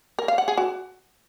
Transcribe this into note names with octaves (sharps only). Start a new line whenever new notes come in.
A#4
F5
F#5
G#4
F#4